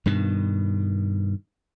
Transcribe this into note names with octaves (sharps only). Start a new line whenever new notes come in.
G2 B2 D#3